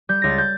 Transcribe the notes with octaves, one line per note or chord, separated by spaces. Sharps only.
G3 G6
C#2 A#6
A6
G6